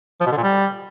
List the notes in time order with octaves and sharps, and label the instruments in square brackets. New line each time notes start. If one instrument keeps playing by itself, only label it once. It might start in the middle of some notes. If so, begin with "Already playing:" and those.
[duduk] F3
B2
D3
A#2
G3